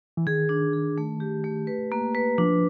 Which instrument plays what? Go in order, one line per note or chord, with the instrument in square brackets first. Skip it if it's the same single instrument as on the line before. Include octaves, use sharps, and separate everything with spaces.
[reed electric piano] E3
[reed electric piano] D#3 [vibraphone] G#4
[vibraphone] D4
G#4
A3
G4
A3
B4
A#3
B4
[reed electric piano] F3 [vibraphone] D4